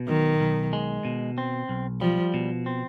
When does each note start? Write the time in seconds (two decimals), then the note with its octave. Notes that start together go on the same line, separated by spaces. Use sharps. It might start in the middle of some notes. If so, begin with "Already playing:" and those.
Already playing: B2
0.08 B1 D#3
0.40 B1
0.73 G#3
1.05 B2
1.38 C4
1.69 B1
2.01 F3 G3
2.34 B2
2.66 C4